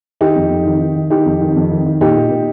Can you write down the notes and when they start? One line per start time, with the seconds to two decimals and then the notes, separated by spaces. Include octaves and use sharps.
0.21 D#3 D#4 G4
0.36 F2
0.50 F2
0.66 D#3
0.81 D#3
0.96 D#3
1.10 D#3 D#4 G4
1.26 F2
1.41 D#3
1.56 F2
1.71 D#3
1.86 D#3
2.01 A#2 D#4 G4
2.16 A#2
2.31 A#2